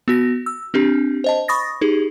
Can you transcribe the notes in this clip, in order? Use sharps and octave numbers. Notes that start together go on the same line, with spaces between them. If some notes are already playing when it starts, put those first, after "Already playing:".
B3 F#4 A#6
E6
C4 D4 G4
C5 D#5 A5
B5 C#6 D#6 A6 A#6
D#4 G4 G#4